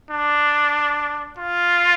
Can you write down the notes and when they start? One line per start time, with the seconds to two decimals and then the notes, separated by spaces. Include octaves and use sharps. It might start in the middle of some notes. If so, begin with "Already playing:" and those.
0.11 D4
1.38 F4